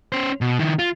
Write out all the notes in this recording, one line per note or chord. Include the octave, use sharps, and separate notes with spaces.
C#4 C5
B2
D#3 E4
F4